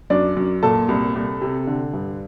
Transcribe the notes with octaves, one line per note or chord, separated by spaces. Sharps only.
F#2 D4 D5
F#2
A#2 A4 A5
C2
C2
C3
D3
G2